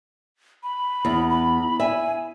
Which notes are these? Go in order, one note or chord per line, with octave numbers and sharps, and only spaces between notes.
B5
E2
B5
E5 G#5